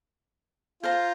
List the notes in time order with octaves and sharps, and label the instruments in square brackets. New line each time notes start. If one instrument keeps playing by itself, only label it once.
[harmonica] F4 [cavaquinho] C5 F5 A#5